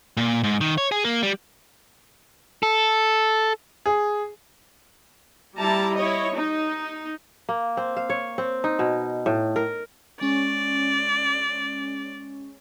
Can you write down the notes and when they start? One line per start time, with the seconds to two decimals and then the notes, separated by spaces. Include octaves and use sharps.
0.17 A#2
0.43 G#2
0.61 D#3
0.78 C#5
0.92 G#4
1.05 A#3
1.23 G3
2.63 A4
3.86 G#4
5.57 G3 E4 A5 A#5
5.96 E4 C#5 D#5
6.35 D#4
7.49 A#3
7.77 C4
7.97 F5
8.10 C#5
8.38 C4
8.64 D#4
8.79 B2
9.26 A2
9.56 A#4
10.21 G#3 C#4 D5